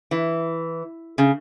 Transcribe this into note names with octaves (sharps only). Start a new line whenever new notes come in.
E3
C#3